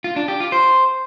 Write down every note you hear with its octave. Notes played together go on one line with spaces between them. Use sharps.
F4
D4
G4
F4
C5